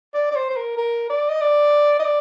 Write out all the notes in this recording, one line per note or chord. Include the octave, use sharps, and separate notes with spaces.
D5
D5
C5
C5
A#4
A#4
D5
D#5
D5
D#5
D5